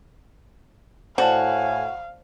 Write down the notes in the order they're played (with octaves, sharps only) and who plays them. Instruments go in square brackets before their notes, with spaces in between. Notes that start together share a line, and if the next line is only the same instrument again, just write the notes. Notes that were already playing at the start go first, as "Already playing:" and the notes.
[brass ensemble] A2 G#5 [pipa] F#4 [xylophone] C5 D5 A5 [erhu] F5